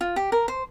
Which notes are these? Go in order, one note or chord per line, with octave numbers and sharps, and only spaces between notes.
F4
G4
A#4
C5